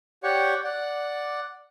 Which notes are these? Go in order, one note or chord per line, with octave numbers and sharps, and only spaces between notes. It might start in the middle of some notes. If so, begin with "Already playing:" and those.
G4 C#5 D5 F#5 G5 C#6
D5 F#5